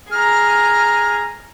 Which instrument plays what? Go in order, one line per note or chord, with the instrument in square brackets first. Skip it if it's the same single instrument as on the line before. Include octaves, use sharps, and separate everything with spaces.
[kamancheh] G#4 A#5 [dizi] F6